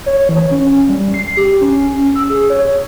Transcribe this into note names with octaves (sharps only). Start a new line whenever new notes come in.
C#5
E3
C#4
G3
C7
G4
C#4
E6
G#4
C#5